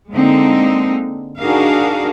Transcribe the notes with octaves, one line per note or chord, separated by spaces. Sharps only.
D3 G#3 A#3 C4 D#4
D4 D#4 F#4 G#4 A#4 F5